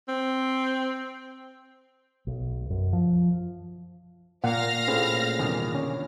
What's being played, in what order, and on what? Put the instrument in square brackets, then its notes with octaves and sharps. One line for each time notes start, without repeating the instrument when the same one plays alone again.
[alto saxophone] C4
[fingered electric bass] B1
F#2
F3
[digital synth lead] A#2 [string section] F5 F6 A#6 [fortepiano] F#5
[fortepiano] A2 [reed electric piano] C#4 G#4 C5
[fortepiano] E2 G2 D#3
[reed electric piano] B2 D3 C#4